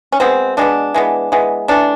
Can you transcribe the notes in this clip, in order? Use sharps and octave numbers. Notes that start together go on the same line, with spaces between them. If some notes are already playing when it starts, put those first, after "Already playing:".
C#4
B2 G#3 B3 C4
B2 G#3 B3 D4
E3 G#3 B3
E3 G#3 B3
E3 A3 D4